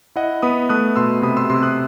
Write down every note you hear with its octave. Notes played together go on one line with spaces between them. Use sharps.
E4 D#5 F#5
B3 B5 D#6
A3 D#6 F#6
B2 C6 E6
C3 B5 D#6
C6 E6
C3 C6 E6
D#6 F#6